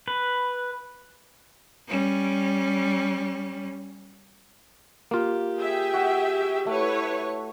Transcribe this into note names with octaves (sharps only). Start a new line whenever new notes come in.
B4
G3 C#4
A#3 F4 G4
G#4 E5 G5
F#4
A3 E4 B4 C#5